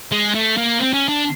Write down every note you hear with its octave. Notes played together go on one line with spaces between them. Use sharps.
G#3
A3
A#3
C4
C#4
D4